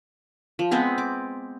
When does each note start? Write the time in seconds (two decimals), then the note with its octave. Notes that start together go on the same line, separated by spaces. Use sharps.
0.59 F3
0.71 G#3 B3 C4 G#4
0.98 D6